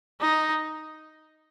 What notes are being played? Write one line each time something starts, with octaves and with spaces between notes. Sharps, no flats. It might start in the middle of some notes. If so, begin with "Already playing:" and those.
D#4